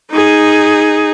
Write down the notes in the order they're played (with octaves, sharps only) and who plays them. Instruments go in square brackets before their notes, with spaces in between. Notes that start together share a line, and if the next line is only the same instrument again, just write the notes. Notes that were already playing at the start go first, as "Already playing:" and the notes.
[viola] D#4 G#4